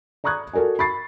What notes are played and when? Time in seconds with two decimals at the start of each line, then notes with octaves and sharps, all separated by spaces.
0.24 D5 A#5 C#6 D#6 F#6 G#6
0.53 F#4 A4 A#4 D5 G#5
0.79 B5 C#6 A6 C7